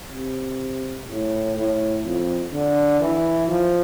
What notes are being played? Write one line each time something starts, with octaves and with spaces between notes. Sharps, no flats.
C3
A2
A2
F2
D3
E3
F3